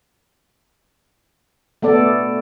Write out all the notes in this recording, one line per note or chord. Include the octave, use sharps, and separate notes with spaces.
A3 B3 A4 D5